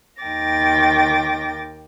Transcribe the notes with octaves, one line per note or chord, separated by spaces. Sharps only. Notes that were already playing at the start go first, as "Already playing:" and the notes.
D#2 D#3 G5 D6 A6 A#6